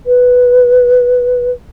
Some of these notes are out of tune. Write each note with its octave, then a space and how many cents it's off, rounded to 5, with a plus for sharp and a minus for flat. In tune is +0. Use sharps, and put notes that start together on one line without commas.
B4 +0